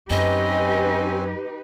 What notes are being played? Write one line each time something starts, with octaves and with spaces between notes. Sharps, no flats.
F#2 C4 C#4 D#4 G4 B4 D#5 G#5